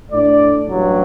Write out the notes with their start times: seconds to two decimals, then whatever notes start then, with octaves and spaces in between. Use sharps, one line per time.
0.12 A2 A3 D4 D5
0.68 A1 G2 F#3